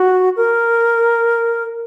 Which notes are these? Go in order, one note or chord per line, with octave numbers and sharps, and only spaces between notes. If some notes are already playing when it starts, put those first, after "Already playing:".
Already playing: F#4
A#4